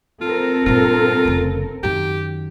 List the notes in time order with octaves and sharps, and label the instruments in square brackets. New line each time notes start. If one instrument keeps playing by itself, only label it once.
[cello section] C4 A4 A#4 [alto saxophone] F4
[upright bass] G2 A#2 [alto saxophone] F4
[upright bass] F1 C#3
[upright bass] F#2 D#3 [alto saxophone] G4